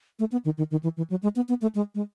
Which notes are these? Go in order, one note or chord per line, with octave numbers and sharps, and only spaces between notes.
A3
B3
D#3
D#3
D#3
E3
E3
F#3
G#3
B3
B3
A3
G#3
G#3